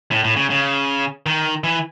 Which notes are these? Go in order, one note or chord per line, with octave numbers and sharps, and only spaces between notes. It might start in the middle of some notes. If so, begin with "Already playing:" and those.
A2
A2
C#3
C#3
D#3
E3